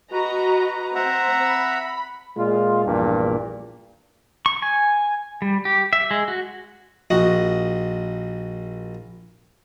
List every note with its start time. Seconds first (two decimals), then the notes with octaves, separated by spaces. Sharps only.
0.11 F#4 B4 D#5 A#5
0.95 C4 C5 E5 F#5 A#5
1.43 B5
2.37 A#2 G#3 F4
2.85 A#1 E2 G2 A#2
4.46 C#6
4.62 G#5
5.42 G3
5.65 G4
5.93 E5
6.11 G#3
6.28 F#4
7.10 A#1 F#4 D#5